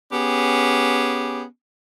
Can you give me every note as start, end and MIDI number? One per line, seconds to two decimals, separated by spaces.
0.13 1.45 59
0.13 1.45 61
0.13 1.45 67
0.13 1.45 68